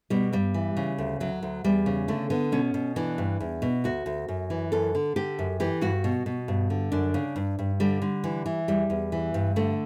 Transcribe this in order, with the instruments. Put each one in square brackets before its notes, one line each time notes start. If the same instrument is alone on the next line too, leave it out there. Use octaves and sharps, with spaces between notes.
[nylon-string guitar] B2 G3
G2 G3
E3
C#3
D2
D2 F#3
D2
E2 G3
C#3
D3 A3
D3 B3
B2 C#4
B2
E3 D4
G2
E2
B2
D2 F#4
D2
F#2
E3
F#2 A4
D3
D3 G4
F#2
E3 G4
G2 F#4
B2
B2
G2
D3
F#2 D4
C#3
G2
G2
D3 G3
D3
E3
E3
E2 G3
E2
E3
G2
D3 A3